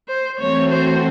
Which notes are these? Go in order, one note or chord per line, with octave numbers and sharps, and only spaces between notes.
C5
E3 A3 C4 F#4 C#5
C5